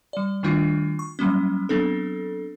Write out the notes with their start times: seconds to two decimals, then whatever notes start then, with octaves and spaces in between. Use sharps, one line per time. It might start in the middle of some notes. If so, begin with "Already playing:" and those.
0.13 G3 D5
0.43 D#3 G3 A3 D4 E4 F4
0.99 C#6
1.19 F#3 G3 A#3 C#4
1.69 F#3 B3 C4 D4 A4